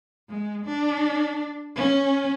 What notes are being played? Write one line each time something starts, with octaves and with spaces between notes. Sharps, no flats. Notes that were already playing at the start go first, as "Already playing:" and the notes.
G#3
D4
C#4